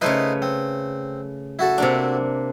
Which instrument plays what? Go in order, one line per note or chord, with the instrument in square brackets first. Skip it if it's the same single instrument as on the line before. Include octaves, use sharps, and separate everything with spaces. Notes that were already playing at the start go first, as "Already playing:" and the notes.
[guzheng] C#3 A3 B4 [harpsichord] D#4 E4 C5
[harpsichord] C4
E4 F#4 A4
[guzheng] C3 A#3 D4